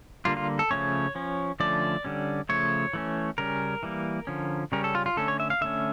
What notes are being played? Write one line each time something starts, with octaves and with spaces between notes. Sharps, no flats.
D3 G3 A#3 F4
F4
A4
C#3 F3 A3 C#4 C#5
F3 C#4
D3 F3 A3 C#4 D5
D3 G3 C#4
C#3 F3 A3 C#5
E3 A3 C#4
C#3 G3 C#4 A#4
E3 G3 A#3
D3 F3 C#4
C#3 G3 C#4 A#4
A4
F4
F4
D3 A3 C#4 A4
C#5
E5
F5
D3 A3 C#4 E5